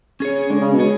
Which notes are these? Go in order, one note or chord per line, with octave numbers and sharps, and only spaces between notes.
C#4 G#4 C#5
D3 G#3
C#3
B2
C#4 G#4 C#5